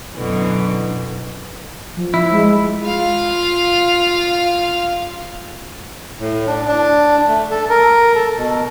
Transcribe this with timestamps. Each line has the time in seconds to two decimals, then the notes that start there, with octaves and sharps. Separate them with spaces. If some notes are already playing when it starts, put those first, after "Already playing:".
0.15 F#2 B2 D3 E3
1.97 F3
2.14 E4
2.32 G#3
2.84 F4 F5
6.20 A2
6.47 D4
6.67 D4
7.28 A3
7.51 A4
7.70 A#4
8.15 A4
8.38 B2